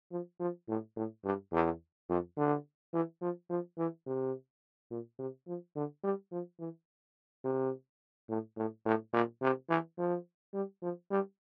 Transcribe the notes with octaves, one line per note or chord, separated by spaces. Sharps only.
F3
F3
A2
A2
G2
E2
F2
D3
E3
F3
F3
E3
C3
A#2
C3
F3
D3
G3
F3
E3
C3
A2
A2
A2
A#2
C3
E3
F3
G3
F3
G3